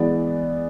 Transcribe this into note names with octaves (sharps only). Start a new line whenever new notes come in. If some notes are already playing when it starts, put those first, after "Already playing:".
Already playing: E3 G#3 B3 D5